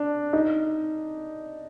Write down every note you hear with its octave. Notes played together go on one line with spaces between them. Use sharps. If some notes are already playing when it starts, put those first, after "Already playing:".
Already playing: D4
D#4